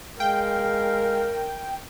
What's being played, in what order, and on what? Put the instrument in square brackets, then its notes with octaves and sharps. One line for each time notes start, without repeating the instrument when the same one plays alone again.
[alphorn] G#3 [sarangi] A#4 [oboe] F5 [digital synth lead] G5